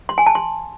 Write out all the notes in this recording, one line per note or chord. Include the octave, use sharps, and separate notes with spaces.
C6
G#5
A5
C6